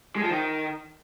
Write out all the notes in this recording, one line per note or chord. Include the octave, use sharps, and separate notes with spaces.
G#3
F3
D#3